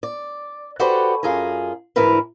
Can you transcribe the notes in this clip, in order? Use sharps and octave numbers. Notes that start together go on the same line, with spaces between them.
D5
F#4 G4 A4 B4 C5 D5
F#2 F4 G#4 G#5 A#5
D2 G#2 E3 E4 A#4 B4